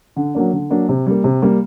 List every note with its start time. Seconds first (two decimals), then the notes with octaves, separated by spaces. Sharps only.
0.16 D3
0.35 F#3 A#3 D4
0.53 D3
0.70 F#3 A#3 D4
0.89 C3
1.07 G3 A#3
1.24 C3
1.42 G3 A#3